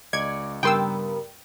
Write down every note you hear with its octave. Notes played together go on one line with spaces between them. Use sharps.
C#2 D5 D#5 G#6 C#7
G2 C#3 G3 B3 A#4 G5 C6 E6